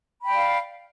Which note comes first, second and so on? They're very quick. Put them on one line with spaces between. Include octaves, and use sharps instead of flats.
B5 G5 D5 F5